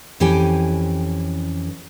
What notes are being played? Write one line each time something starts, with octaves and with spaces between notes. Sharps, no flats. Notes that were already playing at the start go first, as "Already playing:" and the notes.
F2 E3 C#4 G4 G5 G#5